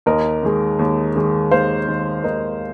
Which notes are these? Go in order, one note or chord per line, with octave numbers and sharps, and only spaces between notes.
D#2 A#4 D#5
D#3 G#3
D#2
D#3 G#3
D#2 C5 F5
D#3 G#3
D#2 A#4 D#5